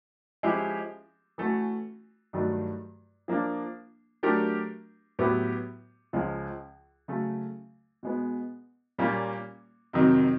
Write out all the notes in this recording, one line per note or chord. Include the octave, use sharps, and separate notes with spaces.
F3 G#3 C#4 E4 G4
E3 A3 C#4 F#4
G2 D#3 F#3 A3
F3 A#3 D4
F#3 A3 D4 G4 A#4
A2 F#3 B3 E4 G4
C#2 C#3 F3 G#3
C#3 F#3 A3
B2 G#3 B3
A#2 G3 A#3 C#4 F4
F2 C3 D#3 F#3